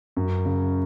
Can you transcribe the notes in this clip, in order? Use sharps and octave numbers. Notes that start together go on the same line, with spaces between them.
F#2
C#3